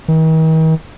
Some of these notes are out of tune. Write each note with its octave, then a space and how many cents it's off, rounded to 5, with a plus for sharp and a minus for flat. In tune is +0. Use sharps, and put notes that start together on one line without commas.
D#3 +45